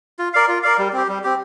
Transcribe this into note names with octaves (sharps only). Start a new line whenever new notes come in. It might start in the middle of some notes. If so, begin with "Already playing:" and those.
F4
A#4 D5 F5
F4
A#4 D5 F5
G3
C4 G4
G3
C4 G4